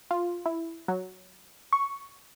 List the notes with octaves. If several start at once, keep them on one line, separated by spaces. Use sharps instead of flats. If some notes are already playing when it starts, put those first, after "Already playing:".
F4
E4
F#3
C#6